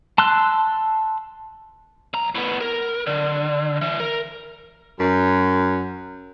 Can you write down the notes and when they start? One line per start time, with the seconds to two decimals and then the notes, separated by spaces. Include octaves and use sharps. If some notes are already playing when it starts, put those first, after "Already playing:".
0.18 A5 C6 E6 F#6
2.14 B1 A#5
2.35 A2 B3
2.61 A#4
3.07 D3
3.81 E3
4.00 A#4
4.98 F#2